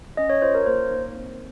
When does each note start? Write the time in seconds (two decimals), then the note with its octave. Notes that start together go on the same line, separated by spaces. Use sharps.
0.17 C#4 D#5
0.30 C#5
0.42 F4 C5
0.55 A#4
0.66 A#3 C5
0.91 D#4
1.15 C4